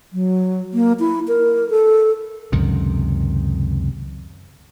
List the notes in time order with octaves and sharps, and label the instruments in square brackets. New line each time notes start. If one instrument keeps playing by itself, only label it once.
[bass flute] F#3
A#3
E4
A#4
A4
[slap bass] C#2 F#2 C3 D#3